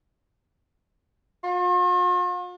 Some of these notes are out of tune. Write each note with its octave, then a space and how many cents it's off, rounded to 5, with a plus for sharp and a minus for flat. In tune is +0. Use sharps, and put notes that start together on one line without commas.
F4 +45